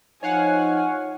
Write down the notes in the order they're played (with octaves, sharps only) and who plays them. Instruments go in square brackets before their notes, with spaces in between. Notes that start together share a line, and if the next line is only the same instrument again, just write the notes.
[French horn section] F3 D#4 [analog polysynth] C#5 F5 F#5 [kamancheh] G#5